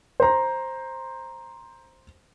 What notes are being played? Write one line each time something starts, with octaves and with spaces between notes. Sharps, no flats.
C5 A#5